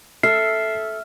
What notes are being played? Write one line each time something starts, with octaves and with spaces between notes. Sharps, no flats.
A4 E5 F6 C7